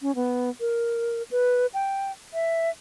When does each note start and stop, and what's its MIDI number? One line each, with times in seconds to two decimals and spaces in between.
0.02 0.14 61
0.15 0.50 59
0.60 1.23 70
1.31 1.67 71
1.74 2.12 79
2.34 2.70 76